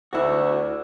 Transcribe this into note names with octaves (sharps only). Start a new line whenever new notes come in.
D2 E4 F#4